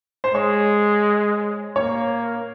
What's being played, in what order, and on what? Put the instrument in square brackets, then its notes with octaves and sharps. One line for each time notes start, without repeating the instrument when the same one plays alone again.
[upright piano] C5
[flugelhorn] G#3 [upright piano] C#5
[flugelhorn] A#3 [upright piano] C#5